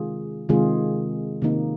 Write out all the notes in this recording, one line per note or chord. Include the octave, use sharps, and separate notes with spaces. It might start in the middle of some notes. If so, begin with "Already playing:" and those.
Already playing: C3 D#3 G#3 F4 G#4
C3 D#3 G#3 F4 G#4
C3 D#3 A#3 D#4